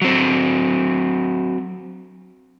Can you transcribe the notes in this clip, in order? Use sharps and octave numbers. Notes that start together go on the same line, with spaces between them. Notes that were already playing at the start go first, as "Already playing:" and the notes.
F#3 C4